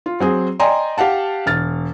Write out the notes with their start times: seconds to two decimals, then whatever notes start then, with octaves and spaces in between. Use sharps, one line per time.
0.06 F4
0.20 F#3 C4 G#4
0.60 D5 D#5 G5 G#5 A#5 C6
0.98 G4 F5 F#5 A5
1.46 E1 F6 A6